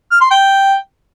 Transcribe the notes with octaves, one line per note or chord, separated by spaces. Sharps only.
F6
C6
G5